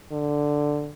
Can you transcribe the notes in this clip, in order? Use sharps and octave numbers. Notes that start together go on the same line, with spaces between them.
D3